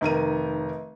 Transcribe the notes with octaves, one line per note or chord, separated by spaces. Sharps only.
F1 D#3 A#4 D#7